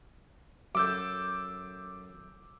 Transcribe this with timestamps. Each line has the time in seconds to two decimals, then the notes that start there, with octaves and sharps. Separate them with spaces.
0.75 F#2 A4 D6 E6 G6